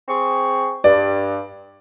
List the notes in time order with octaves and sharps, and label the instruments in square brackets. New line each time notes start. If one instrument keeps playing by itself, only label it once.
[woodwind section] C4 G#4 C#6
[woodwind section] G2 [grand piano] D5